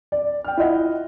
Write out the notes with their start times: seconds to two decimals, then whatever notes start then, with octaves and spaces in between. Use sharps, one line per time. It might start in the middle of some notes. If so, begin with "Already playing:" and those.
0.12 D5
0.44 G5 F6
0.57 E4 F4 D#5 F#5